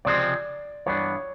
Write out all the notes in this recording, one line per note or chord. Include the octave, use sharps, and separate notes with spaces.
C#2 C3 F3 G#3 C4 D5
G2 E3 G3 B3 D4 C#5